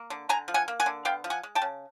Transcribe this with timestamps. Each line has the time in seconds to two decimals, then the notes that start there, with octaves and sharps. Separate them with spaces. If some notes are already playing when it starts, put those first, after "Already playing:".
Already playing: A#3
0.10 D3
0.29 D3 G#5 A#5
0.48 F3
0.54 F#5 G#5
0.68 A#3
0.80 F#5 G#5
0.86 D3
1.05 B3 F5 G5
1.24 F3
1.30 F#5 G#5
1.43 G#3
1.55 G5 A5
1.62 C#3